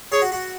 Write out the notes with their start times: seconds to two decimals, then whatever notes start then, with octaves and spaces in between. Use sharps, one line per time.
0.12 G#4 C#5
0.22 F#4
0.32 F#4